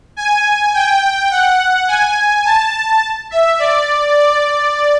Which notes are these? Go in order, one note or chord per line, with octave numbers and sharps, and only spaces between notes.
G#5
G5
F#5
G#5
A5
E5
D5
D5